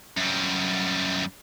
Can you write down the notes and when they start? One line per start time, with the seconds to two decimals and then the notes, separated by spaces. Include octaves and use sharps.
0.17 F#2 G3